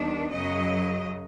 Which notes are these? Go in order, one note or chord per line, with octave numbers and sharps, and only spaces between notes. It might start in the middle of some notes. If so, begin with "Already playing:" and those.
Already playing: D#2 D#3 G3 B3 D4
F#2 C#3 F#3 D#5